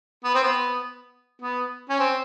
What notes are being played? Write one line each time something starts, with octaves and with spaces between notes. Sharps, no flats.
B3
C4
B3
B3
C#4
C4